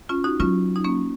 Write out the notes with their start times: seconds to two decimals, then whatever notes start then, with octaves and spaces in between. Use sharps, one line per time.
0.09 C#4 F4
0.24 D#4 F#4
0.40 F#3 C#4 F4
0.76 D#4
0.84 A#3 C#4